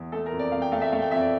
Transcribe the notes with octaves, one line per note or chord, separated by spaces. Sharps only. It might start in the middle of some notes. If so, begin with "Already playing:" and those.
Already playing: E2
A3 A4
A#4
F2
D5
F2 F5
G5
A3 F5
E5
A3 F5
G5
F2 E5
D5